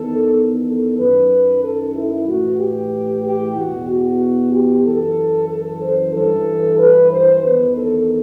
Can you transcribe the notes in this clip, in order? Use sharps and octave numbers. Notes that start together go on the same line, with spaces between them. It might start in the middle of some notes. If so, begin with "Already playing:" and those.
Already playing: E2 D#3 A4
A4
F#2 D#3 B4
A4
E4
A2 E3 F#4
G4
G4
E2 B2 F#4
F#4
G4
F#2 E3 A4
A4
C5
G2 E3 A4
B4
C5
E2 D#3 B4
A4